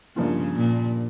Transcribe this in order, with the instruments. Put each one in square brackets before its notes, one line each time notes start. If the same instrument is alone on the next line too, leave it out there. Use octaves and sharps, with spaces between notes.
[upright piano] G2 F3 A#3 F4 [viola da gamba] C#3
[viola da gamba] A#2